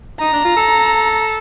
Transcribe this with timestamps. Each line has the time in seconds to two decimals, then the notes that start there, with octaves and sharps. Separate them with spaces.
0.20 D#4 A#5
0.33 D4
0.44 F4
0.56 A4